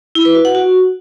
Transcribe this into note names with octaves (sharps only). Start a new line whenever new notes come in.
E4
B4
F#4
F#5
F#4